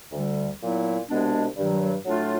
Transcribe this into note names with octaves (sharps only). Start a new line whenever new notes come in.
D2 D3 G3
A#2 F#3 B3 E4
C2 B2 G#3 B3 D4
G2 D#3 F#3
A2 F#3 A3 D4 F4